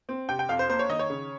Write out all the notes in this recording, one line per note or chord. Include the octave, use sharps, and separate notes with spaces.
C4
C3 G5
G5
F2 F5
C5
A#3 C5
C#5
D#3 D#5
C#5
C#3